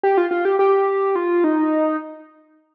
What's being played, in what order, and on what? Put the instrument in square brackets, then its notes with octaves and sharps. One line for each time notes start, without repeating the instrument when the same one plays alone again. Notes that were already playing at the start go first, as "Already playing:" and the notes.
[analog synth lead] G4
F4
F4
G4
G4
F4
D#4